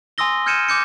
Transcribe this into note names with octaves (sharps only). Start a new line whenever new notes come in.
G#5 C6 D#6 E6 A#6 G7
F6 G6 G#6 C#7 D#7 E7
D6 G6 C#7